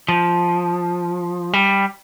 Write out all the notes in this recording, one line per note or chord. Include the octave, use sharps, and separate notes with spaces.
F3
G3